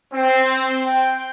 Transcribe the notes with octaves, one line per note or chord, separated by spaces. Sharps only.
C4
G5